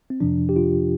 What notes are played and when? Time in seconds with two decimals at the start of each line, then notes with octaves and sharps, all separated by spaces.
0.10 C4
0.20 F2 C3 F3 D4
0.49 G4
0.56 F4